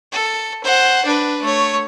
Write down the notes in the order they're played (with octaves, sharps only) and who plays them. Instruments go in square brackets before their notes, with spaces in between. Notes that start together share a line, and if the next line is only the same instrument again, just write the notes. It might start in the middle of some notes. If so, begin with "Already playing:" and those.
[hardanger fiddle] A4
C5 F#5
D4 B4
A3 C#5